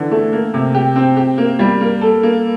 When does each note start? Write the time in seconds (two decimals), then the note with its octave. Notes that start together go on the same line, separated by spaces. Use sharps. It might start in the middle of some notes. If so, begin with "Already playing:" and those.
Already playing: D3 E3
0.11 A3
0.33 A#3
0.54 C3
0.74 G4
0.96 C4
1.17 G4
1.38 A#3
1.59 G3
1.81 A#3
2.01 A4
2.23 A#3